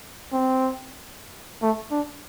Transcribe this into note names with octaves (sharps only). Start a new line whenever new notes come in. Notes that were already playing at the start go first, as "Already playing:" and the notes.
C4
A3
D4